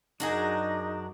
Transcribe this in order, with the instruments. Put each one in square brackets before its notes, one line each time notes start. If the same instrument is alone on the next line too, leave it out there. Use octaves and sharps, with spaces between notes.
[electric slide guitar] F#2 F#3 [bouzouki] D4 F#4 G#4 [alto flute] D#4